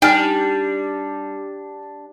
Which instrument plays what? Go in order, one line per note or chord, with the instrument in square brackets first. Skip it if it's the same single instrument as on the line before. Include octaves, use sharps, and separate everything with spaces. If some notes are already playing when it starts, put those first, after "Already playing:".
[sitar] G3 [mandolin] D4 [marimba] D#4 G#5 F6 [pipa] G5